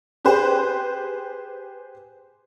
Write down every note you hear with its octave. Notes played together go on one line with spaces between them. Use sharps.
G4 G#4 B4 C5